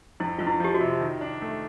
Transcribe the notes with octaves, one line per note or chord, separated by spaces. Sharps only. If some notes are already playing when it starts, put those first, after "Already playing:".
F2 E4
F2 F4
E4
F3 G4
F#4
C3
D#3
D4
A3